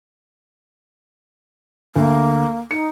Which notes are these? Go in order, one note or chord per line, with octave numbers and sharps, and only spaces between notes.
D2 A#3
D#4 C#7